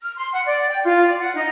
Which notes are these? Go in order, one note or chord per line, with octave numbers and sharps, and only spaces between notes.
F6
C6
F#5
D5
G5
F4
D5
F#5
D#4